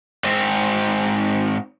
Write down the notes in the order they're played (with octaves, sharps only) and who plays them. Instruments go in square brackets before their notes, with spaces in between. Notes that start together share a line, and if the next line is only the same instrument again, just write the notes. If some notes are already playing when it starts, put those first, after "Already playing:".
[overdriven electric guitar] G#2 C4